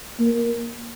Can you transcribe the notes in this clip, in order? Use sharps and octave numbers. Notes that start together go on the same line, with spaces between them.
A#3